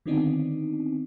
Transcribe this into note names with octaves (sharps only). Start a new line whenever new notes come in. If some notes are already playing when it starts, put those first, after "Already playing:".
D3 D#3 B3 C4 D4 D#4